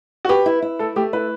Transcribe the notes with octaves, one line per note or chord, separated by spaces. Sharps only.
F#4
G4 B4
E4
E4
A3 A4
A3 G4
E4 B4